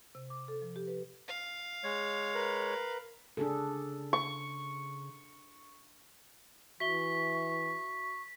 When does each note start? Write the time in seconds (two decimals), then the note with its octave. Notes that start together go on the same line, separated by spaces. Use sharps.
0.15 C3
0.30 D6
0.48 A4
0.62 F3
0.76 G4
0.87 B4
1.28 F5
1.84 G#3 C#5
2.34 A#4 B4
3.37 C#3 D4 G#4 A4
4.13 C#6
6.80 E3 F#4 E5 C#6 B6 G7